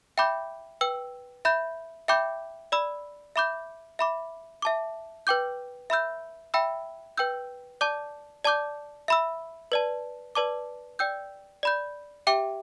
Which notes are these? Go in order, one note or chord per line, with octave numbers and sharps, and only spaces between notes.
E5 G5 B5 D6 G6
B4 G5 E6
E5 B5 G6
E5 G5 B5 D6 G6
D5 B5 E6
E5 B5 D6 G6
E5 B5 D6
E5 A5 D6
B4 G5 D6 G6
E5 B5 E6 G6
E5 G5 B5 E6
B4 G5 E6 G6
D5 A5 D6 G6
D5 A5 D6 G6
E5 B5 E6
B4 D5 A5
B4 D5 A5 D6
D5 G5 E6 G6
D5 B5 G6
G4 E5 G5 D6